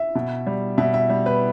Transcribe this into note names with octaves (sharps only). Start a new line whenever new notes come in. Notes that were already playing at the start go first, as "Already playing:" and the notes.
Already playing: E5
B2
G3
B2 E5
E5
G3
B4